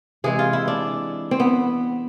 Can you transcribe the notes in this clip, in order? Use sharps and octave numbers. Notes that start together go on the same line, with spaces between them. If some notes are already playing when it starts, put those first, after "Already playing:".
C3 E3 G#3 G#4
F4
E4
D4
C4
B3